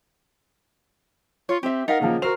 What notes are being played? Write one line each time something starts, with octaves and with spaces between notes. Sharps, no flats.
F4 C#5
C4 G4 E5
D#4 A#4 D#5 F5 F#5
C#3 F3 A#3
F#4 A#4 C5 F6 F7